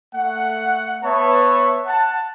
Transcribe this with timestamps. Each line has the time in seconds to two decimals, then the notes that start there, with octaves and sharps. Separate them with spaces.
0.15 A3 F#5
1.04 B3 B4 C#5 E5 A5
1.87 F#5 A5